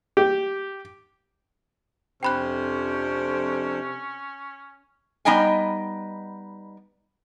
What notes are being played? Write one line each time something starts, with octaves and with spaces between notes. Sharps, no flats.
G4
F2 C3 C#4 D4 C5 G5 B5 F#6
G3 B3 D#4 D#5 G5 G#5